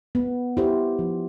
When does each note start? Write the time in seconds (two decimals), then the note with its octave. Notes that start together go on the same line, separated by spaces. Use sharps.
0.15 B3
0.57 E4 G4 C5
0.99 F3